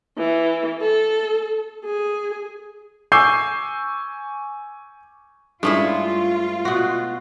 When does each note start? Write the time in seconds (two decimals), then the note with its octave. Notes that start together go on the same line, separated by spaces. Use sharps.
0.18 E3
0.81 A4
1.84 G#4
3.12 G#5 C#6 D6 E6 G6 C7
5.63 G2 G#3 A3 C#4 E4 F4
6.65 B2 F#4